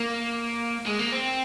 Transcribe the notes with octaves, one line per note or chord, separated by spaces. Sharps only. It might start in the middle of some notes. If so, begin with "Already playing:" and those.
Already playing: A#3
G#3
A#3
C4